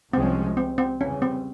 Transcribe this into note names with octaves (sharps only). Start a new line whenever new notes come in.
C2 C3 F3 G#3 C4 C#4
C4
C4
E2 C#3 G3 C#4
C4